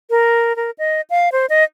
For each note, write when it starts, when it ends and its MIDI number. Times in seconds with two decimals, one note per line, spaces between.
0.10 0.56 70
0.56 0.71 70
0.78 1.01 75
1.10 1.29 77
1.32 1.46 72
1.50 1.64 75